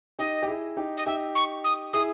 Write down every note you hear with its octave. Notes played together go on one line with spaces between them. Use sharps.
D#4 G4 D#5
G4
E4 G#4
D#4 G4
D#5
D#4 G4 E5
C#6
D#6
E4 G#4 D#6